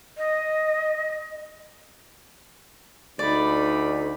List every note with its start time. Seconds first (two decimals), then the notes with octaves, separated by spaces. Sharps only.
0.17 D#5
3.19 D2 D#4 D5 B5